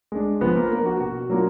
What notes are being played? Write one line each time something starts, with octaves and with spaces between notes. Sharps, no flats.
G#3 D4
F3 B3 B4
A#3 A#4
A#3 D4 A#4
F#4
B2 F#4
F#3 A#3 D4 F4